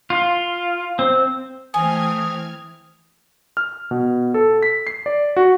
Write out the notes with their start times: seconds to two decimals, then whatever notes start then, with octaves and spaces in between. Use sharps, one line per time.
0.10 F4
0.99 C4
1.74 E3 A3 C4 G#5 D#6 F6 G#6
3.57 F6
3.91 B2
4.34 A4
4.62 B6
4.87 C7
5.06 D5
5.37 F#4